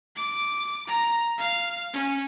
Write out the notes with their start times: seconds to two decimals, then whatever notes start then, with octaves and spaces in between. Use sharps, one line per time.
0.16 D6
0.87 A#5
1.38 F5
1.93 C#4